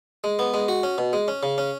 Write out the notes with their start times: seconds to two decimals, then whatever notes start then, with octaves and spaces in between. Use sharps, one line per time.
0.24 G#3
0.39 B3
0.54 G#3
0.68 F#4
0.83 C#4
0.98 B2
1.13 G#3
1.28 C#4
1.43 C#3
1.58 C#4